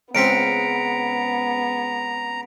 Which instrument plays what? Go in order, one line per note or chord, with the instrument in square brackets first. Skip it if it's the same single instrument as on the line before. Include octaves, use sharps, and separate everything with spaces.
[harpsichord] C#2 C#3 C4 [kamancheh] B3 [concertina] A#5 [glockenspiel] B6 C#7 D7